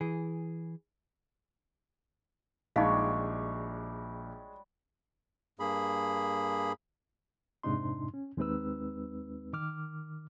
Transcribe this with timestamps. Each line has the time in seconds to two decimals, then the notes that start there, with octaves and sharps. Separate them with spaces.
0.01 E3 G#4
2.76 A#1 G3 G#3 D#4 F#4 C#5 F5
5.60 G2 A#3 G#4 B5
7.63 F2 G#2 C3 D4 D#4 C6
8.14 C#4
8.37 D#2 G#3 C4 D#4 B4 E6
9.53 D#3 D6 F6